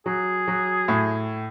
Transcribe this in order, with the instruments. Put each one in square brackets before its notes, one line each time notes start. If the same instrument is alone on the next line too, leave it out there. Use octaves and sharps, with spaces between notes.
[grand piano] F#3 [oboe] G#4
[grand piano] F#3
A2